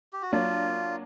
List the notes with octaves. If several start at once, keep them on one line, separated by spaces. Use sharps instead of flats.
G4
F#4
F#3 A#3 D4 F4